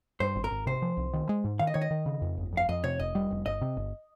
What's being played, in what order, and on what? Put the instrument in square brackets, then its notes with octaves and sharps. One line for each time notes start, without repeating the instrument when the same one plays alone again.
[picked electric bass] G2 [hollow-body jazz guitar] C5
[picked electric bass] G#1
[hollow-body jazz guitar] A#4
[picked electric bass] G#1
[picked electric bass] C3 [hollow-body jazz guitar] C5
[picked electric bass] F3
C2
D#3
G#3
G#2
[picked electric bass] D#3 [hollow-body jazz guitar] F5
[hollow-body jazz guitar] D#5
[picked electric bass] D#3 [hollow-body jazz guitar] C#5
[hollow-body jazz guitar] D#5
[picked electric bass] D#3
C#3
F2
G1
[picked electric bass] F2 [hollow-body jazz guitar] F5
[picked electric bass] F2 [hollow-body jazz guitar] D#5
[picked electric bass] C3 [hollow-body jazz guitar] C#5
[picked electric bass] F1 [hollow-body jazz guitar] D#5
[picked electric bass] G3
F1
[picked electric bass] G1 [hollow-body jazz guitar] D#5
[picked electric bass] C3
G1